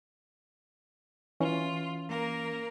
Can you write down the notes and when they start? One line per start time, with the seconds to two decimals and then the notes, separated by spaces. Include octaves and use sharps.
1.40 E3 C#4 F4
2.09 A#3 A#4